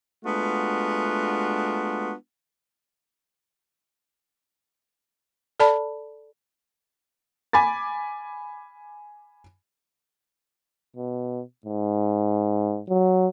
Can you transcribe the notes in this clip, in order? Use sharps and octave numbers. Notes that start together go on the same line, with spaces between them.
G#3 A3 B3 D4 F4 F#4
A4 D5 A5 B5
G#5 B5 D6 A6
B2
G#2
F#3